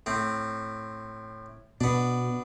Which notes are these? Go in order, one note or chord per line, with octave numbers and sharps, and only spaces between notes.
A2 C4
B2 B3 D4